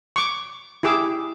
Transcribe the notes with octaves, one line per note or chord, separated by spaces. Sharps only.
C#6 D6
E4 G4 G#4 D6 E6